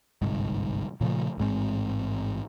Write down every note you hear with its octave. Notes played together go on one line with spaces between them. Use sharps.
G1 C2 G#2
A#2 C#3 F3 A3
A1 G#2 G#3 C4